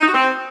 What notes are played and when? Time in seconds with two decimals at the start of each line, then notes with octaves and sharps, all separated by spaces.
0.01 D#4
0.08 F#4
0.14 C4